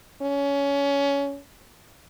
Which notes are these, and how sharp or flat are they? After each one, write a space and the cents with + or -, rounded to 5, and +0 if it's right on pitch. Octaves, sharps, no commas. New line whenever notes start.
C#4 +20